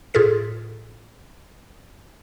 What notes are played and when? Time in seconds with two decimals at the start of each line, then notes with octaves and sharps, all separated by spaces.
0.14 A2 F4 G#4 A4 B6